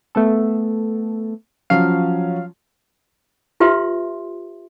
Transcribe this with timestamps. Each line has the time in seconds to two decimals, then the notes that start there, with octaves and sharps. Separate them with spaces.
0.15 A3 B3 A4
1.70 F3 F#3 C#4 F5
3.60 F4 G4 B4 E5 C6